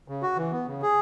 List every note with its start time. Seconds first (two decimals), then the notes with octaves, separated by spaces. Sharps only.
0.08 C#3
0.23 F#4
0.37 E3
0.52 B3
0.67 C#3
0.82 G#4